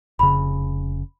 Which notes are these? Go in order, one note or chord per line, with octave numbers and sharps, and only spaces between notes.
F1 C#3 B5